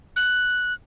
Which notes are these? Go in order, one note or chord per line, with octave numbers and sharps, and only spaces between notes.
F#6